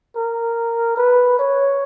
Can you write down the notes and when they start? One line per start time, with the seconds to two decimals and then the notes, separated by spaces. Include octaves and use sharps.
0.16 A#4
0.97 B4
1.39 C#5